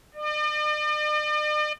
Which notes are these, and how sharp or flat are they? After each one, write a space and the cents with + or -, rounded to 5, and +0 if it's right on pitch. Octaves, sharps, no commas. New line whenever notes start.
D5 +45